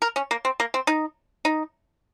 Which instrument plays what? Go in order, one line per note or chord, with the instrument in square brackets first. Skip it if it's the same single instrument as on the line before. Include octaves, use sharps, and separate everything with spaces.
[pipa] A#4
C#4
A#3
C4
A#3
C4
D#4
D#4